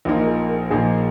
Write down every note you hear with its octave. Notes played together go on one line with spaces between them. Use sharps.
A#1 A#2 F3 A#3 D#4 F4
A#4
G#4
A#4
A#1 A#2 F3 A#3 D#4 G#4